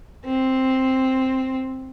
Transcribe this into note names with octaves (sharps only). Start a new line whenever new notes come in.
C4